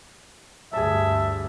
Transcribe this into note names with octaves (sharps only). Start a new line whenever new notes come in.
D2 G2 G#4 E5 A5